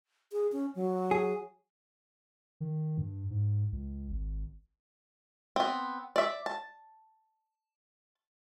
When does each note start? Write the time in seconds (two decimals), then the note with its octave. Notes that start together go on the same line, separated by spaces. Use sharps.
0.32 G#4
0.52 C#4
0.75 F#3
1.11 G#4
2.60 D#3
2.98 G2
3.30 G#2
3.72 C#2
4.10 G#1
5.56 B3 C4
6.16 D5 E5
6.46 A5